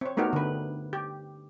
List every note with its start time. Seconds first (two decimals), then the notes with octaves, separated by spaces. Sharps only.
0.01 C4 C#5
0.17 A3 B3 D#4 F#4 G4 A#4
0.33 D3 B4
0.93 G4